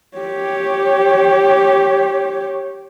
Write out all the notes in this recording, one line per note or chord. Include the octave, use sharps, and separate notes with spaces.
G4 C#5